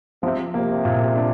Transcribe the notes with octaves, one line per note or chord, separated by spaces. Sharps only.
C3 F3
C3 A#3
A#2
D4